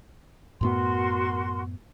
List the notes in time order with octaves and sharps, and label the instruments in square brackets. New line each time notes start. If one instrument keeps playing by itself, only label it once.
[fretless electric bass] F#2 A2 B3 [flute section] F#4 A#4 C6